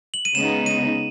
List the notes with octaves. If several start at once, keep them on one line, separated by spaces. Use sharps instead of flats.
F#7
D#7
C#3 G#3 B3 D#4 E7
D#7